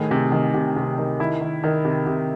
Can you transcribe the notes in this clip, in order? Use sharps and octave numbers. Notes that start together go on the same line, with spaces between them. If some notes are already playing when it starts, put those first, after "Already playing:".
Already playing: A2 D#3 G#4
C3
D#3
C3
C3
D#3
D#3 E4
D#3
D#3
C3
C3